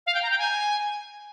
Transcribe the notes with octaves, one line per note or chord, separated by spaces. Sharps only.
F5
G5
A#5
G5
G#5